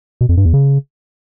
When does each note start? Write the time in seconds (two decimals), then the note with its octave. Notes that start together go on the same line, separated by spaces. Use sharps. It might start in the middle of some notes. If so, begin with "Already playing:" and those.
0.21 B2
0.29 F2
0.37 G2
0.45 E2
0.54 C#3